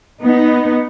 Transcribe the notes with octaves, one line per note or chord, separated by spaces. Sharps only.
B3 D#4